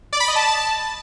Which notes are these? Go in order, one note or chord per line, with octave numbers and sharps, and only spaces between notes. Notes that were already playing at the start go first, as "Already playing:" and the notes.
D5
B5
D#5
A5